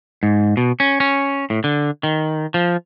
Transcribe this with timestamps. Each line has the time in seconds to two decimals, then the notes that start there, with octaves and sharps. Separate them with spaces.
0.23 G#2
0.57 B2
0.80 C#4
1.00 C#4
1.50 A2
1.64 D3
2.03 D#3
2.54 F3